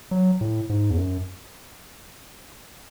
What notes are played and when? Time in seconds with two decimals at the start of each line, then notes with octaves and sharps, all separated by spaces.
0.11 F#3
0.41 A2
0.69 G#2
0.90 E2
0.97 F#2